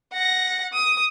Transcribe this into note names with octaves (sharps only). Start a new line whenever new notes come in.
F#5 A#6
D#6